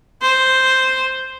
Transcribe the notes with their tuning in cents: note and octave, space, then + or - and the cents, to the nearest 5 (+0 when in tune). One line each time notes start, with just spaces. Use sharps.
C5 +0